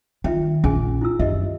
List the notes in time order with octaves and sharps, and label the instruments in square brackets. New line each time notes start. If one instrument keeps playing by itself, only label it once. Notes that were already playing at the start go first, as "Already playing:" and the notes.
[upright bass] D#3 [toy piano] F4 E5 G5
[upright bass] A#1 F2 [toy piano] C#4 G#4 G#5
[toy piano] E4 F4 E6
[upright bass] F#2 D#3 [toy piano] G4 D#5 E5